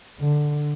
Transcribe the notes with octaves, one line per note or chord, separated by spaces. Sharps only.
D3